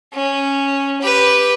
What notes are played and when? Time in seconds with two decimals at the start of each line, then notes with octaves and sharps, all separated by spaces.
0.14 C#4
1.01 G4 B4